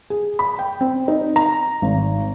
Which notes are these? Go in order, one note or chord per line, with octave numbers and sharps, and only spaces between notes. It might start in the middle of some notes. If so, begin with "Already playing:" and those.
G#4
B5
G5
C4
D#4
A#5
G#1